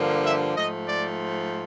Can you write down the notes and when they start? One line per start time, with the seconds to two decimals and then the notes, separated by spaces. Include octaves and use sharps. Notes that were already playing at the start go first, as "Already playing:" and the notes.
Already playing: G2 D3 F3 A#3
0.24 E5
0.56 G#2 F3 A3 D#5
0.88 D5